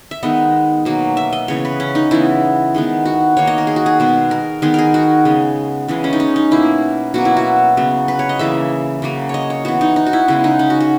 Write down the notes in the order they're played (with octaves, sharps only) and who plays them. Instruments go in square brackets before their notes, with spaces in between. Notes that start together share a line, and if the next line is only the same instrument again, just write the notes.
[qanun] E5
D#3 G#3 B3 D#5
B2 F#3 A#3
E5
D#5
C#3 E3 B3 C#5
B4
C#4
D#4
C#3 E3 G#3 B3 E4
D#3 G#3 B3
F#4
D#3 A#3 C#5
D#5
A#4
G#4
F#4
G#4
B2 G#3 B3
A#4
D#3 G#3 B3 G#4
G#4 A#4
F#4
C#3 G#3 B3
C#3 E3 G#3
C#4
D#4
C#4
D#4
B2 A#3 E4
B2 F#3 A#3 F#4
E4
F#4
C#3 F#3 B3
B4
C#5
D#5
C#3 E3 A#3 E5
C#3 F#3 A#3
C#5 D#5
C#5
E3 B3 F#4
D#4
D#4
F#4
E4
C#3 G#3 B3 E4
D#4
C#4
F#4
F#4